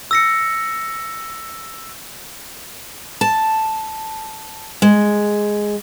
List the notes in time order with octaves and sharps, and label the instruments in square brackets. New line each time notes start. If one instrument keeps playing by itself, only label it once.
[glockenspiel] E6 A#6 C#7
[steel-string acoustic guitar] A5
G#3